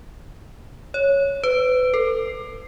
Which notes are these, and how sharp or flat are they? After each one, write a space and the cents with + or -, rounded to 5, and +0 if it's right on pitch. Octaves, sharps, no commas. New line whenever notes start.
C#5 +0
B4 +35
A4 +40